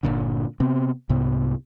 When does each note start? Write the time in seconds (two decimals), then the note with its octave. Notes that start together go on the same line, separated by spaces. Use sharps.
0.03 G1 C2 A#2 D3
0.60 C3 B3 C4
1.09 C2 G#2 C3 B3